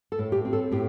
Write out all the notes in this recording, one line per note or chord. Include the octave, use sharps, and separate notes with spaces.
A4
A2
G4
C4
A4
A2 G4